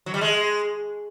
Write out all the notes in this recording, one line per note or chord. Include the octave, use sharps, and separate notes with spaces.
F#3
G3
G#3